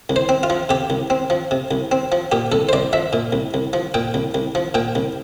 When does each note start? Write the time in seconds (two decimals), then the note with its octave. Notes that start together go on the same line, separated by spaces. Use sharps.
0.10 C2
0.16 C5
0.29 C4
0.43 F4
0.50 F3
0.69 C3 G4
0.90 C2
1.10 C4
1.30 F3
1.51 C3
1.71 C2
1.92 C4
2.12 F3
2.32 A#2 G4
2.52 C2 A4
2.69 C5
2.73 C2 D5
2.93 F3 E5
3.13 A#2
3.33 C2
3.54 C2
3.73 F3
3.94 A#2 G5
4.14 C2
4.34 C2
4.55 F3
4.74 A#2 G5
4.95 C2